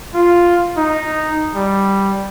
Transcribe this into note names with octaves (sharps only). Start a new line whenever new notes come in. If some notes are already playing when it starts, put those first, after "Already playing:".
F4
D#4
G3